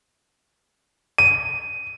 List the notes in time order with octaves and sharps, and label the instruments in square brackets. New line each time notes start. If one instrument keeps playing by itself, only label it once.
[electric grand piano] D#7